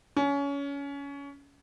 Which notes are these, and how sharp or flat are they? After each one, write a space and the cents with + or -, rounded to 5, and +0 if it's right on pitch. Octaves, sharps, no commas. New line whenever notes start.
C#4 +25